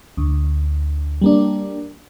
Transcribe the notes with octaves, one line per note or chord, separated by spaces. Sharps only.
D2
G3 A#3 D4